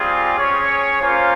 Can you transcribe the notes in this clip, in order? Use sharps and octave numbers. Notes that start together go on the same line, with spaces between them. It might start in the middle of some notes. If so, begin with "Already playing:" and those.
Already playing: G3 C4 F4 G#4
C#4 G#4 C#5
A#3 C#4 F4 C5 F5